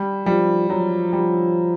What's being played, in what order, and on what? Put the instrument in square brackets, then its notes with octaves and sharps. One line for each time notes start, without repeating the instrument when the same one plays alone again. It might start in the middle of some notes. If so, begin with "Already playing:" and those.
Already playing: [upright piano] G3
[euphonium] F3 [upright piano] G3
[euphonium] F3 [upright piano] F#3
[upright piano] G3